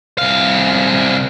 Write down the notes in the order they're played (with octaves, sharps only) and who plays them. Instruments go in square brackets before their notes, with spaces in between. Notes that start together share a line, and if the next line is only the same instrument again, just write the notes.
[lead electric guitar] C2 F5